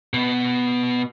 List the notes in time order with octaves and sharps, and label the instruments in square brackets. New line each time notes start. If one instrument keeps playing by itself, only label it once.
[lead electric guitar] B2 B3